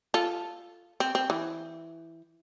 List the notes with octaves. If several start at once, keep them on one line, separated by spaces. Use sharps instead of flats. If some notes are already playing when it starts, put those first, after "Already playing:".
F4 A4
C4
C4
E3